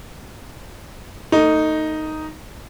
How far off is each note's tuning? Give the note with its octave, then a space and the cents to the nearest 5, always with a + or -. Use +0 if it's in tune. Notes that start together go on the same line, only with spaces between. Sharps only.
A3 +25 D#4 +0